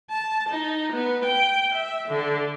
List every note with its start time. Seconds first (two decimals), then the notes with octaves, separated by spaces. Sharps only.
0.10 A5
0.49 D#4
0.92 B3
1.25 G5
1.75 E5
2.08 D3